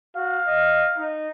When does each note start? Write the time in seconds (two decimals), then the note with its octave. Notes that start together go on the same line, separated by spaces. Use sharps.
0.16 F#4 F5
0.47 D#5
0.97 D#4